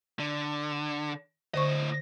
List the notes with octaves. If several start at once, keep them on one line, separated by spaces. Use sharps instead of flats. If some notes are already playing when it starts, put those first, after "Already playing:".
D3
A2 D3 C5 D#5 C#6